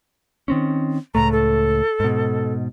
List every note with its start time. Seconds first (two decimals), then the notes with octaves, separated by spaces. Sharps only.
0.48 D#3 C4 C#4
1.15 C#2 A2 A3 A#5
1.32 A4
2.00 G#2 B2